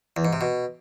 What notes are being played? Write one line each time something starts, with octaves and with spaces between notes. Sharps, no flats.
E2
G#2
C3
B2